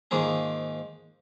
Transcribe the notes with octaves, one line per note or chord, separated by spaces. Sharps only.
G#2 D#3 F3 A#3 G#4